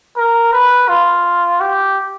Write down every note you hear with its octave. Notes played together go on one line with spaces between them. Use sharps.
A#4
B4
F4
G4